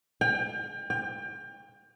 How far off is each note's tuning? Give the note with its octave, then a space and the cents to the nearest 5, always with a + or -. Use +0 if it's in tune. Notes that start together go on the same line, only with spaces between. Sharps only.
G5 +35
G5 +30